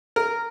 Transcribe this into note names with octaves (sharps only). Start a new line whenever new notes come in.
A#4